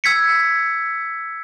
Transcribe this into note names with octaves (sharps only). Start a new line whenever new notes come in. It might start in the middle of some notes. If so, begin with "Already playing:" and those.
E6 G#6 B6 C#7